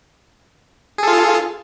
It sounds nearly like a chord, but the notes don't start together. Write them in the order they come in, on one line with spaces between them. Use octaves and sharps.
G#4 A4 F4